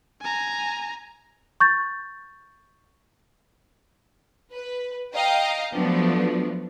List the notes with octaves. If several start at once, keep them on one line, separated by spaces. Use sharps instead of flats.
G#5 A#5
C#6 G6 A6
B4
D#5 F5 G5 A#5
F3 F#3 A3 B3 D4